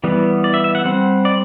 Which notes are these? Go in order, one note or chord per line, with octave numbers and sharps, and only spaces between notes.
E3 G3 B3
D5
E5
E5
F#5
G3 C4 F#5
D5